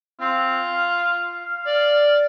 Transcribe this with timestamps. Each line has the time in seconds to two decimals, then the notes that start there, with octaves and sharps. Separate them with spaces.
0.20 C4 F4
0.73 F5
1.66 D5